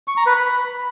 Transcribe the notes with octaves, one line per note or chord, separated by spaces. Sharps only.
C#6
A#5
B4
B5